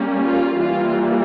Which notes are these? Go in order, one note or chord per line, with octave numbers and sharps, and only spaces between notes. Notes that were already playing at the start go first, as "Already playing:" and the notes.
Already playing: G3 A#3 C#4
F4
E3 G3 A#3 F4